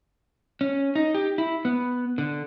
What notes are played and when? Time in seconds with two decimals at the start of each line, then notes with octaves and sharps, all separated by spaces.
0.61 C#4
0.95 D#4
1.14 G4
1.38 E4
1.65 B3
2.18 D3